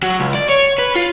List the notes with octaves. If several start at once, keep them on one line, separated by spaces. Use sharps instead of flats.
F#3
C#2
D5
C#5
B4
F4